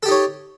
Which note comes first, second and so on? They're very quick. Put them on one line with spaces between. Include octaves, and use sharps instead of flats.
A4 G4 D#4 C#5